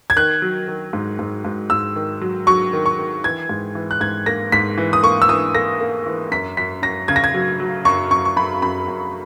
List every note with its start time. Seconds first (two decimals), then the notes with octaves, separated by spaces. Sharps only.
0.10 G#6
0.16 D#3 F#6
0.42 F#3
0.68 D#3
0.93 G#2
1.19 G#2
1.45 G#2
1.70 G#2 E6
1.96 D#3
2.21 F#3
2.47 F#3 C#6
2.73 D#3
2.86 C#6
2.99 D#3
3.24 E3 G#6
3.49 G#2
3.75 E3
3.91 F#6
4.01 G#2 G#6
4.26 A#3 A#6
4.52 G#2 B6
4.78 E3
4.93 D#6
5.03 A#3 C#6
5.22 E6
5.29 E3 D#6
5.55 A#3 A#6
5.80 A#3
6.06 E3
6.31 F#2 B6
6.57 F#2 B6
6.82 F#2 A#6
7.08 C#3 G#6
7.16 A#6
7.24 G#6
7.34 F#3
7.60 F#3
7.85 F#2 C#6
8.11 F#2 C#6
8.25 C#6
8.36 F#2 B5
8.62 F#2 B5
8.88 F#2